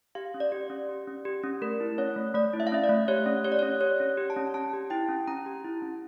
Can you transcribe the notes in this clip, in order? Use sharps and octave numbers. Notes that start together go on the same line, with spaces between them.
G4 F5
C#4
D5
G4
C#4
G4
C#4
G4
C#4
A3 A#4
E4
C#4 C#5
A3
A3 D5
E4
E5
F5
C#4 E5
D5
A3
G4 C#5
C#4
G4 C#5
D5
C#4 C#5
G4 C#5
C#4
G4
A5
C#4
C#4 A5
G4
E4 G5
C#4
C#4 A#5
G4
E4
C#4